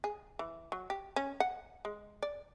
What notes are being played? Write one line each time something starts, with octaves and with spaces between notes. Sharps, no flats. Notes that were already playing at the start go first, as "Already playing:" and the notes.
G#4
E3
F#3
G4
C#4
F#5
G#3
D5